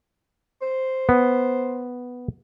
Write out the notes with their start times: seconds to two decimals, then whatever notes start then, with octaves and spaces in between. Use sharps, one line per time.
0.62 C5
1.09 B3